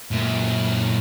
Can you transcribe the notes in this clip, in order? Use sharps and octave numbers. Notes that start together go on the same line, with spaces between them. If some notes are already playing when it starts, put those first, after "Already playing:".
F#2 A#2